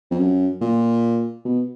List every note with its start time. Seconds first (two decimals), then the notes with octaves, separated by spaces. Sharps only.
0.11 F2
0.19 F#2
0.61 A#2
1.45 B2